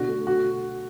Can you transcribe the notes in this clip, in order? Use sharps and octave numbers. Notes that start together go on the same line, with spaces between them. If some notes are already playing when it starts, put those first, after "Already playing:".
Already playing: B2 D3 F#4
A3
F#4